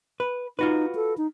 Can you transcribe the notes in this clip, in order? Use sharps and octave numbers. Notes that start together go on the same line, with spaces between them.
B4
D#4 F4 F#4 B4
A4
D#4